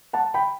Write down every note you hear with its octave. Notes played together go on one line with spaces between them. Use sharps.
F#5 A5
G5 B5